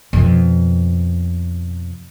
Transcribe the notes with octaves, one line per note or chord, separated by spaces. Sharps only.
F2 B2